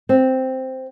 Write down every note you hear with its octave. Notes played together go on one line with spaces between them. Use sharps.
C4